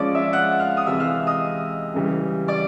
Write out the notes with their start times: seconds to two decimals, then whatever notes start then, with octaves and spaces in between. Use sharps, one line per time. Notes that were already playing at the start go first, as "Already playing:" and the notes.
Already playing: F3 G#3 C#4 D5 D6
0.15 E5 E6
0.33 F#5 F#6
0.59 F5 F6
0.77 D#6
0.86 C3 E3 G#3 E5 E6
1.00 F5 F6
1.27 D#5 D#6
1.94 C#3 E3 G3
2.48 D5 D6